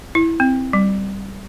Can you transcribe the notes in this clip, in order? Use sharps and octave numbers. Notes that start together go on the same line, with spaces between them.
E4
C4
G3